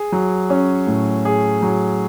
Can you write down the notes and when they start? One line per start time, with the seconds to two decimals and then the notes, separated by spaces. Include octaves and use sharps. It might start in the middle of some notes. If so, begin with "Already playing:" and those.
Already playing: G#4
0.12 F#3
0.50 C#4
0.87 A2
1.25 G#4
1.62 F#3